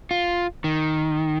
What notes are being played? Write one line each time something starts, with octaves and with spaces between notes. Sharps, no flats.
F4
D#3